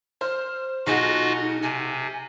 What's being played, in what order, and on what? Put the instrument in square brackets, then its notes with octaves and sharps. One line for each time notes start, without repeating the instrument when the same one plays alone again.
[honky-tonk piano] C5 [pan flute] F6
[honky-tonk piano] B1 G#4 F#5 [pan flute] D#4 [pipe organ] F4 F#4 D#5
[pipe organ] C3 [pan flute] G#5